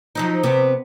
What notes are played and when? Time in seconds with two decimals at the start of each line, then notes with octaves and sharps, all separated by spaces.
0.15 F3 F#3 D#4
0.43 C3 B3